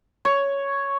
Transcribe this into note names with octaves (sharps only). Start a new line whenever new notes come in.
C#5